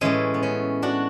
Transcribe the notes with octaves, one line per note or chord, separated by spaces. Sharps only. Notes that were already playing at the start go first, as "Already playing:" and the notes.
A2 E3 G#3 C#4
B3
C#4
D4 F#4